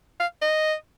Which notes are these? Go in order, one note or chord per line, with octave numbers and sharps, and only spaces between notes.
F5
D#5